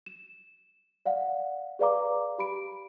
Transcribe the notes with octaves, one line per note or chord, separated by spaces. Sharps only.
E7
D5 F5 F#5
G#4 B4 D5 F5 A#5 D6
G4 B5 D7